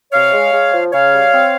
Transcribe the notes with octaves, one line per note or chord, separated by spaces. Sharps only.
C3 C#5 F5
G#3
G#3
F3
C#3 C#5 F5
G3
C4